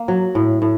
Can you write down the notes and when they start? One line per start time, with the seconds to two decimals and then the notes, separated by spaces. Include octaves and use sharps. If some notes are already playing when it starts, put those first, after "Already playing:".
Already playing: A#3
0.08 F#3
0.35 A2
0.62 A2